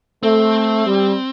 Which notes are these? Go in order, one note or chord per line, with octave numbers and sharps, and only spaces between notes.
A3 C4
G3